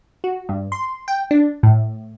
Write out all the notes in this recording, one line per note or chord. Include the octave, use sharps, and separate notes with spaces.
F#4
G2
C6
G5
D4
A2